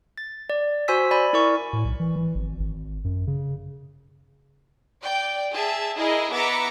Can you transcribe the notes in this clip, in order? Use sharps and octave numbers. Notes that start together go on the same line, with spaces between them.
A6
D5
F#4 C5 G#5 C6 E6 B6
D5 G#5 B5
E4 A#4 D5 G#5 C#6
A2
B1
E3
E3
G#1
G#1
F#2
C#3
D5 G5
G#4 E5 A5
E4 G#4 A#4 D#5
B3 E5 A#5 D6 B6 C#7